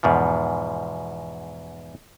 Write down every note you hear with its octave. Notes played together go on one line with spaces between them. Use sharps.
E2 G#2 B2 F3